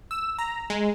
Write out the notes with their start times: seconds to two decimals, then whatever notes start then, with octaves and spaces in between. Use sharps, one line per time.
0.11 E6
0.39 A#5
0.70 G#3